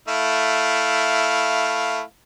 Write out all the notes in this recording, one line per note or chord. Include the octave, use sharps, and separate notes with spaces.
A3 E4 F5